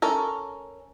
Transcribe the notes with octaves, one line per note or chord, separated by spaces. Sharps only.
C#4 A4 A#4